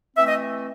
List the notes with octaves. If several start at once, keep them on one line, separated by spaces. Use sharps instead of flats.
E3 A3 C4 E5
D#5